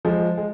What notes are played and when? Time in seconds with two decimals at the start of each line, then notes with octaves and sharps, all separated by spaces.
0.05 F3 G#3
0.37 G#3